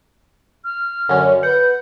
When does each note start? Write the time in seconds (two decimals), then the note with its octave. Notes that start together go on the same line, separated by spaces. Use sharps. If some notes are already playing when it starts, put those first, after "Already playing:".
0.64 F6
1.09 F#2 D3 C#4
1.43 B4 F#5 G6